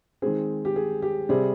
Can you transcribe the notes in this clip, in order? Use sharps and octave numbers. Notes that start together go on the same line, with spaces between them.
D#3 G#3 C4 G#4
G4
G#4
G4
C3 G3 C4 G#4